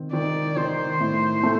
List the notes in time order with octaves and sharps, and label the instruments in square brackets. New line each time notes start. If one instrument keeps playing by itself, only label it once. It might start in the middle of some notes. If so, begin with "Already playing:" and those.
Already playing: [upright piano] D#3 C4
[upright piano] D#3 [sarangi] D5
[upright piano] D#3 [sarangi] C5
[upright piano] A2
A3